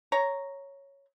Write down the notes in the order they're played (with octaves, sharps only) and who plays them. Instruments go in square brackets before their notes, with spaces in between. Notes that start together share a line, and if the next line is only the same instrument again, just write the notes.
[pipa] C#5 A#5